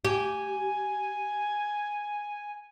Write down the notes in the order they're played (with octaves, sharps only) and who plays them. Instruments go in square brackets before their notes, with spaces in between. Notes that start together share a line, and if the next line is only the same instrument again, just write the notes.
[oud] G4 [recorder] G#5